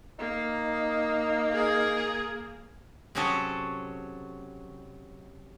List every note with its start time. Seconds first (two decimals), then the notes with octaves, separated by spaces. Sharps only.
0.19 A#3 D#4
1.51 G#4 A#4
3.15 C3 F#3 C#4 F#4 G#4 A4